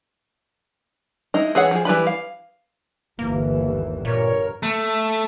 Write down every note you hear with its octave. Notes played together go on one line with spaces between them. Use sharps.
G#3 D#4 E4
E3 G#4 C#5 F#5
F3 G#4
E3 G3 B4 B5
F5
G1 D#2 E3 A#3
G2 A#2 A#4 C#5
A3